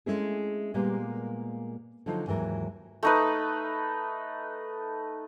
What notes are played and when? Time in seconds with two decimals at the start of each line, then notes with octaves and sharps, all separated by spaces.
0.06 G#3 A3 C4 C#4 E4 G#4
0.74 A#2 G3 G#3 A#3 B3
2.06 D3 F3 F#3 D#4 F4 C5
2.26 D#2 G#2 E3 F#3 A#4
3.03 A3 D#4 B4